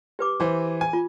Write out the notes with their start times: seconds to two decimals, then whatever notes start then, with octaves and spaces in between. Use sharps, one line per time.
0.19 G4 B4 D6
0.40 E3 C5
0.81 G#5
0.93 F4